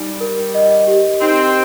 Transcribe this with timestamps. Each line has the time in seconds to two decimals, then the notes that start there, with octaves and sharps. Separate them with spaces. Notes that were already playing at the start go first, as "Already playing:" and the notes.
Already playing: G3 D#4
0.21 A#4
0.54 D#5
0.87 G4
1.21 C4 D#4